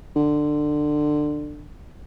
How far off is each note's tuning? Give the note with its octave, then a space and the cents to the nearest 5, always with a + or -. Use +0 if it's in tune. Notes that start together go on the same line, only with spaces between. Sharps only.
D3 +20